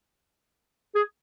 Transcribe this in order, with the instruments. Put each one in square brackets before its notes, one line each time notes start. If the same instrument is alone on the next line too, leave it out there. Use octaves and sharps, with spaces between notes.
[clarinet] G#4